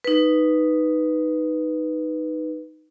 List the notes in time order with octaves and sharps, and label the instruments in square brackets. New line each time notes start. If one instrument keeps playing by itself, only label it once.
[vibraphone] D#4 B4